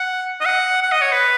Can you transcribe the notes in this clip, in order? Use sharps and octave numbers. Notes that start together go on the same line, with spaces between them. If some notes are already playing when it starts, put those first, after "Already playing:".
Already playing: F#5
D#5
F#5
F#5
D#5
C#5
B4